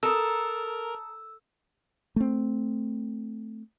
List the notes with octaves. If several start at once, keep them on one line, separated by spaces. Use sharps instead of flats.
A4 A#4 A5 A#5 D#6 E6
A3 C4